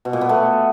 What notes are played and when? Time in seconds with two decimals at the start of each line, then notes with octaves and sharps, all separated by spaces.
0.05 B2
0.13 A#2
0.21 B3
0.29 A3